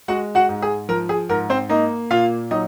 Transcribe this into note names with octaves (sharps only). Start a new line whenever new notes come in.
G#3 F#4 F#5
F#4 F#5
G#2
G#4
F3 A#4
G#4
G#2 A#4
C4 C5
A#3 D#4 D#5
A#2 F4 F5
F#3 D#4 D#5